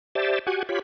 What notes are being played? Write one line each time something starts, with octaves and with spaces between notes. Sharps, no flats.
G4 C5 D5 E5 A5
F#4 G4 F#5 G#5
F4 G4 C#5 B5